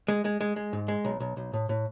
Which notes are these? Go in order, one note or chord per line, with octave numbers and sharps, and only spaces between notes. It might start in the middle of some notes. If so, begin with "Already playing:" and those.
G#3
G#3
G#3
G#3
G#2
G#3
B1
B1
B1
A2
A2